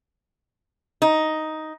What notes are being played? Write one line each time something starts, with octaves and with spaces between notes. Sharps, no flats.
D#4